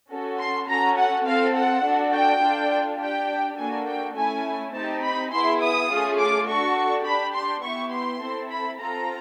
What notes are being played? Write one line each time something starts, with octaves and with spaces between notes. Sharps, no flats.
C#4 F#4 A4
C6
C#4 F#4 A4 A#5
F#5
C4 F4 A4 F5
F#5
D4 F#4 A4
G5
D4 F4 A4
D4 G4 G5
A#3 D4 F#4 A4 G#5
G5
A3 C#4 E4 G#5
C4 D#4 G4 A5
B5
B3 E4 G#4 C6
D#6
A3 C#4 F4 G#4
D6
D4 F#4 A4 C#6
D4 G4 B5
C6
B3 E4 G4 C#6
C6
C4 E4 A4
B5
C4 F4 A4 A#5